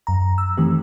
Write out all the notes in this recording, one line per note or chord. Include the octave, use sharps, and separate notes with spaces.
F#2 A#5
E6
D#3 E3 A3 C4 G4